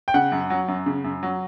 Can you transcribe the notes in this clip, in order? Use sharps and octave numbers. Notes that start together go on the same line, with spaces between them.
G5
C#3 F#5
F#2
F#3
F#2
C#3
F#2
F#3